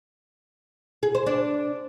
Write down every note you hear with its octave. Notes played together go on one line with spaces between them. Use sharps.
G#4
C5
D4